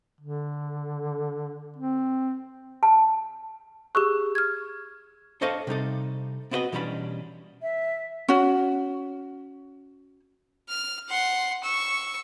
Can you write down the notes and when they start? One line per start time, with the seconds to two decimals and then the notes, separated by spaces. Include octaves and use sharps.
0.21 D3
1.76 C4
2.83 A5
3.95 G4 G#4 C#6 E6 F#6
4.35 F6 G#6
5.41 D4 A4 C5 C#5 D#5 F5
5.67 C3 G3 D#4 A4
6.51 B3 C4 E4 F#4 B4 D#5
6.72 B2 E3 G3 C#4 D4 B5
7.62 E5
8.28 C#4 F#4
10.69 F6
11.09 F#5 C6
11.64 C#6 E6